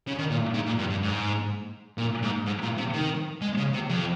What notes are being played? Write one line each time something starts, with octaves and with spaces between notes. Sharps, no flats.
C#3
D#3
A#2
G#2
A#2
G2
G2
G#2
A#2
G#2
G#2
A#2
C3
D#3
G#3
C#3
C3
F2